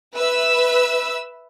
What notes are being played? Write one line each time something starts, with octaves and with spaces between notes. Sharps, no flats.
B4 E5 E6